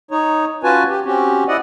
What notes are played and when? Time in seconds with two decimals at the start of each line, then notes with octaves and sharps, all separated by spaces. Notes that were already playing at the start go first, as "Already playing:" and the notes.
0.11 D#4 C#5
0.64 C#4 F4 F#4 B4 G#5 A5
0.89 G4
1.05 C4 C#4 F#4 G4
1.48 E4 D5 D#5 F#5